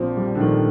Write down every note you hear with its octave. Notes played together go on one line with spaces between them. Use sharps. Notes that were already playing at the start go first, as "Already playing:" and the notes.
Already playing: A#1 A#2 F3 C4
G3
D3
A#1 D#3